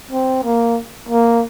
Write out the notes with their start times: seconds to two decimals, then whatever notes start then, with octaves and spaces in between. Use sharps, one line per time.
0.11 C4
0.44 A#3
1.09 A#3